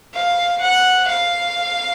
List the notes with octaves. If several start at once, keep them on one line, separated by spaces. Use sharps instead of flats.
F5
F#5
F5